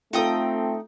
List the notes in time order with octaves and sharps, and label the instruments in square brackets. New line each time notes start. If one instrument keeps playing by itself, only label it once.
[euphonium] A3 [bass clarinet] C4 [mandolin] D#4 G5 D#6 [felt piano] F4 A4